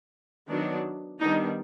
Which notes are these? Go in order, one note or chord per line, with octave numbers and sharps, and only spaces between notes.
D#3 F#3 B3 D4
D#3 G3 B3 D4 D#4